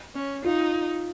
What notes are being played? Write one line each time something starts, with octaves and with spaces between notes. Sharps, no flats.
C#4
D#4 F4